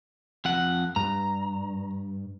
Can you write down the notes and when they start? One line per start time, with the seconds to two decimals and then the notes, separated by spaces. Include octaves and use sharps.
0.45 F2 F#5
0.96 G2 A#5